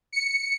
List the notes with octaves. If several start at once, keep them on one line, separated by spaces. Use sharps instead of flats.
C#7